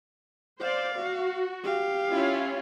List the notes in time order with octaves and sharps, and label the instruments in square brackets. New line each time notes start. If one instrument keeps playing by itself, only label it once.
[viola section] C5 D5 [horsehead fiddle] F5
[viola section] F#4
[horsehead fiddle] G4 F5
[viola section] C#4 E4 F4